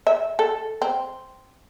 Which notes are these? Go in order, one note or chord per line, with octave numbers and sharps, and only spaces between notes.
E5
A4
C4